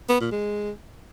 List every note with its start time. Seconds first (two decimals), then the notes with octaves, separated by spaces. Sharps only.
0.09 B3
0.21 A#2
0.32 G#3